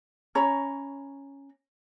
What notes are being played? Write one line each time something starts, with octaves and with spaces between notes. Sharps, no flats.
C#4 C#5 A#5 B5